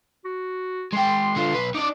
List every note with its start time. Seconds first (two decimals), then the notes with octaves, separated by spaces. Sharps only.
0.25 F#4
0.93 G#3 G5 C6
1.36 D3 F4
1.54 B1 B4
1.74 D#4 D5 D6